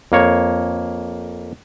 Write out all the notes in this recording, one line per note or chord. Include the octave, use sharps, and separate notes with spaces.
F2 A#3 C#5